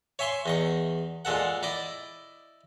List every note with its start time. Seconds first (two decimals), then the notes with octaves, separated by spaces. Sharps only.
0.19 C#5 E5 G#5 C6 C#6
0.46 E2 D#5 C#6
1.25 A#2 G#3 A4 F#5
1.63 E4 D5 D#5